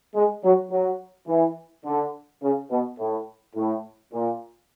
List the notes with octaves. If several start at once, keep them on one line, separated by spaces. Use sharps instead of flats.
G#3
F#3
F#3
E3
D3
C#3
B2
A2
A2
A#2